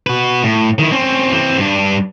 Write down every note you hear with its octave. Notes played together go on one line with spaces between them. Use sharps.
F#4 B4
A2
D#3 E4
C4 C#4
E3 C4
G2 D4